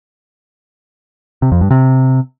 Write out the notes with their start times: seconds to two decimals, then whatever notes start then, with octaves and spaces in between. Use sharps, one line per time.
1.42 C3
1.52 F2
1.61 G2
1.71 C3